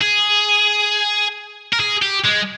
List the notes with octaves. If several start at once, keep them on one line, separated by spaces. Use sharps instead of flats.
G#4
A#4
G#4
G4
G#3